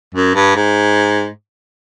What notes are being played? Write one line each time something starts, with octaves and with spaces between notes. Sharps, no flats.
F#2
G2
G#2